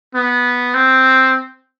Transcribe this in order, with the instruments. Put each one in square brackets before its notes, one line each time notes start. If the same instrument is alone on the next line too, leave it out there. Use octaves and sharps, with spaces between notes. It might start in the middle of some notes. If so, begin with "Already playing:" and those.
[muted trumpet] B3
C4